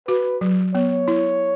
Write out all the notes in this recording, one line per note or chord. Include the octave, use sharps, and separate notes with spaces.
F#4 B4
F#3
B3 C#5
E4